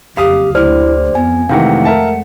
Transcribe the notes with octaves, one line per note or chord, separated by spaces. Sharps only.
F#1 F2 G4 F5 D#6
D2 E4 G4 C5 D5 F6
F2 B3 G#5
F2 C3 D#3 E3 G#3 A3 F5 F#5
A#4 E5 A5